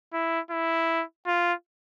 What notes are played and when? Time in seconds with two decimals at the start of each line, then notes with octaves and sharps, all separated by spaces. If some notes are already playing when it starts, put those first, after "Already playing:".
0.13 E4
0.51 E4
1.27 F4